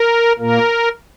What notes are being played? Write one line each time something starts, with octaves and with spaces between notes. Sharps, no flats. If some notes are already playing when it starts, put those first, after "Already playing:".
Already playing: A#4
A#2 A#3 A#4